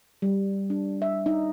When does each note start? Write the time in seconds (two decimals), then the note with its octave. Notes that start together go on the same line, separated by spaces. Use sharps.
0.22 G3
0.70 D4
1.02 E5
1.26 D#4